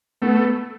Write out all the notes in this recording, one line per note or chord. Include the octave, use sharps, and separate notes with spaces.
A3 B3